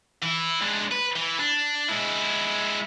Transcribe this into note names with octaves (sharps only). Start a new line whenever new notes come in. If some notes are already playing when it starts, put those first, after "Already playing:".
E3 E4
G#3 D4
B4
E3
D4
G#3 E4